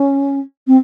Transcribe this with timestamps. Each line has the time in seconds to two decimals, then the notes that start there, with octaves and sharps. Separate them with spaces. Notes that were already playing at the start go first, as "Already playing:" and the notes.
Already playing: C#4
0.67 C4